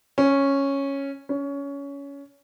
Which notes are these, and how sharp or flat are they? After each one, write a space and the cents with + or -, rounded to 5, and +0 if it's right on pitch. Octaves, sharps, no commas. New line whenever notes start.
C#4 -5
C#4 +20